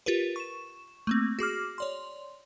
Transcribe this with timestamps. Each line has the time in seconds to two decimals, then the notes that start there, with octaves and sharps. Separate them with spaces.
0.06 F4 G4 A#4 B4
0.36 C#6 E7
1.07 A3 A#3 C4
1.39 F#4 G#4 D6 F6
1.78 C#5 D5 C6